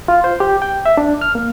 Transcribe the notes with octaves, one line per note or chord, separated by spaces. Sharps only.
F4
C5
G4
G5
E5
D4
F6
A#3